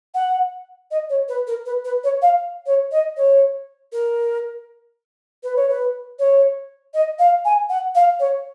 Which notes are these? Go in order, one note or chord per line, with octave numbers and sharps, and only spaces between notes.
F#5
D#5
C#5
B4
A#4
B4
B4
C#5
F5
C#5
D#5
C#5
A#4
B4
C#5
B4
C#5
D#5
F5
G#5
F#5
F5
C#5